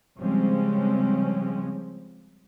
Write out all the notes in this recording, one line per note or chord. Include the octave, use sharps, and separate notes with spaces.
C#3 F3 G3 G#3 C4 C#4